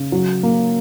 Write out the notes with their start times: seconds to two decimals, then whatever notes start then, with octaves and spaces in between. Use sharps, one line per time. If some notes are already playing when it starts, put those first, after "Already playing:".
Already playing: C#3
0.12 F#3
0.43 A#3